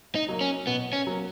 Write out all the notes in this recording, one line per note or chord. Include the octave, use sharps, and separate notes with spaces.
D#4
F#3 A#3
C#4
B2 B3
C#4
F#3 A#3